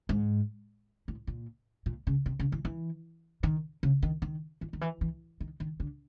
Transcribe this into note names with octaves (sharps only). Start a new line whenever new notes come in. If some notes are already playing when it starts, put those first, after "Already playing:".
G#2
A2
A#2
A#2
C#3
C3
C#3
E3
E3
D#3
C#3
D#3
D#3
E3
D#3
E3
E3
D#3
D#3
D3